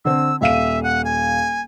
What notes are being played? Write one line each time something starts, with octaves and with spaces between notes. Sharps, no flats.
D3 C4 E6
D#1 E5 F5 D#7
F#5
G#5